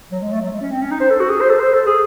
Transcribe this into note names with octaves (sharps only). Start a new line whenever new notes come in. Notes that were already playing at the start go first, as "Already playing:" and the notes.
F#3
G#3
A3
F#3
G#3
C#4
C4
C#4
D#4
C5
A4
F#4
G#4
C5
A4
C5
A4
G#4